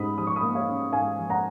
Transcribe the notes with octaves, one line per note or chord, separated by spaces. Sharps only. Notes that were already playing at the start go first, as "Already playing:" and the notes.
Already playing: G#2 C#4 B5 D#6
F3 D#6
C#6
B5 D#6
A#3
C#5 F5
C#4
G#2 F5 G#5
F3
F#5 A#5